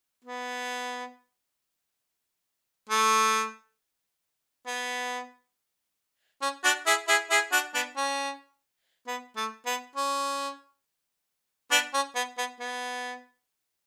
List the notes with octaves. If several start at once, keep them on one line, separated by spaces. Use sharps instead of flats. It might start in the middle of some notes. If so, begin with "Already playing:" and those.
B3
A3
B3
C#4
D4 F#4
E4 G#4
E4 G#4
E4 G#4
D4 F#4
B3 D4
C#4
B3
A3
B3
C#4
B3 D4
C#4
B3
B3
B3